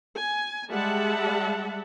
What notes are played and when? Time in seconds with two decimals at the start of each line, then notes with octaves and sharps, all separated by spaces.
0.16 G#5
0.69 G3 G#3 E5 F#5 A5